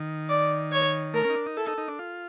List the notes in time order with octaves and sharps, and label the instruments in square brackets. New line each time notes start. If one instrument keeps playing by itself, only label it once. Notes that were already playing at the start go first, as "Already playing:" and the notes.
Already playing: [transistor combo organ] D#3
[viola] D5
C#5
[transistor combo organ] A3 [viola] A#4
[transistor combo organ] C#4
D#4
D4
D#4
[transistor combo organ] E4 [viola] A4
[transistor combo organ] D#4
D#4
D4
F4